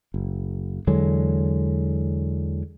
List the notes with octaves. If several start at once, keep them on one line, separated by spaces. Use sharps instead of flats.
F#1
E2 D3 F#3 G#3